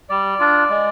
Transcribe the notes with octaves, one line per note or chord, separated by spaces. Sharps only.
G3 D5
D4 F4
G#3